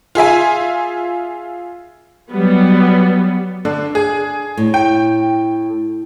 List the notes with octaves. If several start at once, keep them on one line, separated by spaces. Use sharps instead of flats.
F4 G#4 E5 G#5
F#3 G3 B3
D3 D4
G#4
A2
G5